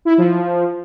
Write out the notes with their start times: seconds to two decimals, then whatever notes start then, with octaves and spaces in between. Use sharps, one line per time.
0.05 E4
0.18 F3